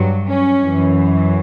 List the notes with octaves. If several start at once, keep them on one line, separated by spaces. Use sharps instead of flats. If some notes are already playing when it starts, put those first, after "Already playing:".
Already playing: G2 F#3
C#4
F#2 E3